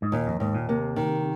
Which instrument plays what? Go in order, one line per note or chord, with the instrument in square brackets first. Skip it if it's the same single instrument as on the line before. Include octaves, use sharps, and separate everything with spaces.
[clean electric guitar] G#2
[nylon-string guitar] D#2 [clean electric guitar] A#2
[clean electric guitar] F2
[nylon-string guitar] D#2 [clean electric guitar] G#2
[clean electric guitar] A#2
[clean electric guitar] C3 [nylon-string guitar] A#3
[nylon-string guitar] D#3